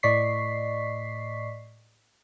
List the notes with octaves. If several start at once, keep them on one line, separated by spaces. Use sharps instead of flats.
A2 D5 D#5 C#6 B6 C7